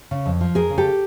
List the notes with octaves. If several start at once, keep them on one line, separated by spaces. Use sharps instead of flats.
C#3
F2
F3
F2 G#4 A#4
C#3
G4 A4